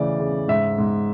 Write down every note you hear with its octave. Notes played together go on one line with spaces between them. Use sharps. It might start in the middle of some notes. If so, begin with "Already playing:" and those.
Already playing: C#3 E3 A3 D5
C#3
G#2 E5
G#2